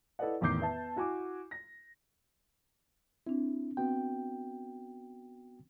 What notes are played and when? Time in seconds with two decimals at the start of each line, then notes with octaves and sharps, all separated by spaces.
0.19 E4 A4 B4 D5 D#5 F#5
0.41 A1 E2 D#3 D6 G6 C7
0.61 B3 E5 A5
0.96 E4 F#4 G#5 D6
1.51 A#6
3.27 C4 D4 E4
3.77 B3 C4 F#4 G5